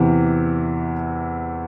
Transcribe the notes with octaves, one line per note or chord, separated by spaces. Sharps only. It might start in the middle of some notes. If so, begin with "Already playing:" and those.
Already playing: E2 C3 E3